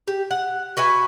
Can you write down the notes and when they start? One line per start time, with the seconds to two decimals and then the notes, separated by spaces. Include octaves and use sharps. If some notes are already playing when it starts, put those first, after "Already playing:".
0.08 G4
0.31 F#5
0.77 F#4 B4 E5 G#5